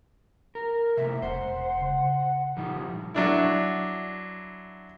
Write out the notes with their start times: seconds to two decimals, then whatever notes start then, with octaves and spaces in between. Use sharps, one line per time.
0.55 A#4
0.97 C3 A3 A#3 E5
1.22 E1 C#4 C5 F#5
1.80 C#3
2.57 A#2 F3 G3 D#4
3.14 F#3 D4 E4